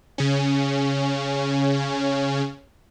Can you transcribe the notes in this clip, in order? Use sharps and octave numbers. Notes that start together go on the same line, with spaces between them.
C#3 C#4